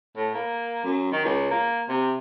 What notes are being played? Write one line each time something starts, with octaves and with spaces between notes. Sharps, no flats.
A2
A#3
F#2
D#3
C#2
A#3
C3